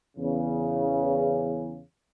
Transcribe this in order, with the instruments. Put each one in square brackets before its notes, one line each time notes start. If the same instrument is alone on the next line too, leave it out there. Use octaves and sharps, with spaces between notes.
[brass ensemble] E2 C#3